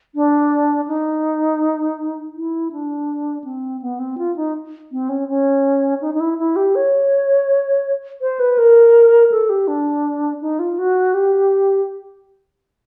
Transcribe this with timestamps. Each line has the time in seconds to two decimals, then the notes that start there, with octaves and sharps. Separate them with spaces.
0.15 D4
0.88 D#4
2.35 E4
2.72 D4
3.44 C4
3.82 B3
3.99 C4
4.18 F4
4.36 D#4
4.92 C4
5.09 C#4
5.29 C#4
6.01 D#4
6.14 D#4
6.20 E4
6.38 E4
6.56 G4
6.75 C#5
8.21 C5
8.39 B4
8.58 A#4
9.32 A4
9.50 G4
9.68 D4
10.42 D#4
10.59 F4
10.79 F#4
11.14 G4